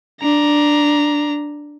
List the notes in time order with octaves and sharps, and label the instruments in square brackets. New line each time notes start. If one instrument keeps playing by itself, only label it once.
[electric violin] D4 A#5